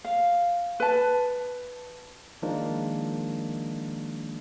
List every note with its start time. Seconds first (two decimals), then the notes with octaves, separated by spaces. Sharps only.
0.05 F5
0.80 B4 A5
2.42 D#3 F3 G#3 A#3 D4 D#4